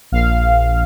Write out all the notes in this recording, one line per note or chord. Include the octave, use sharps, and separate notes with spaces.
A#1 F5